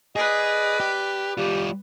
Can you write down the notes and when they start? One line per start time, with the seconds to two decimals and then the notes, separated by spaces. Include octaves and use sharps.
0.16 G#4 B4 D5 D#5
0.80 G4
1.38 G3 F4 G4